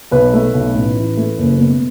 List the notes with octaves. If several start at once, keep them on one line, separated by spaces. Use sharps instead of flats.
B1 B4
A3
B1
A1
E3
A3
F#1
B2